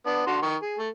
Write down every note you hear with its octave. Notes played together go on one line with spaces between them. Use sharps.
B3 D4
D3 F#4 C6
D#3 C#6
G#4
A3